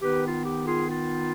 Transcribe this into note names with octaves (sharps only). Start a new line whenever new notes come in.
D#3 B3 D#4 G4 B4
F4
G4
F4 G#4
F4